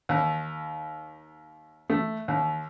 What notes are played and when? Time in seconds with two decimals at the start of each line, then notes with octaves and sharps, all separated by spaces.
0.09 D#2
1.90 A3
2.28 D#2